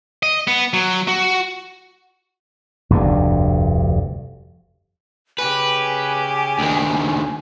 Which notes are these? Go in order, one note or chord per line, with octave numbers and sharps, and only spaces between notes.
D#5
B3
F#3
F#4
F1 D2 G2
C#3 G4 B4 G#5
D2 D#3